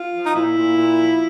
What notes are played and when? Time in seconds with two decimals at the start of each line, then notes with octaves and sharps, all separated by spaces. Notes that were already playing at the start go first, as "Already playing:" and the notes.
Already playing: F4
0.13 F3
0.25 D#4
0.35 A#2 E4
0.57 A#2
0.77 A#2
0.99 F3